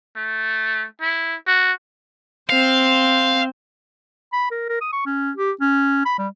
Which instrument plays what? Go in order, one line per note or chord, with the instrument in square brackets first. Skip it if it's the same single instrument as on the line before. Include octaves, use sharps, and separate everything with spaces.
[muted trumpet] A3
E4
F#4
[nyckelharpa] C4 C5 [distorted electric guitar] F5
[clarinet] B5
A#4
A#4
D#6
C#6
C#4
G4
C#4
B5
G3